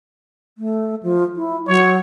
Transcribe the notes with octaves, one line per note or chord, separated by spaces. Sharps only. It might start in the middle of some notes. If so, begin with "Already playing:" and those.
A3
F3
E4
F#3 C#5